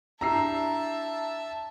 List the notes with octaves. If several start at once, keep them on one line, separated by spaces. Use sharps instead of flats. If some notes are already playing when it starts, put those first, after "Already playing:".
D4 E4 G4 E5 A5 A#5 E6 C7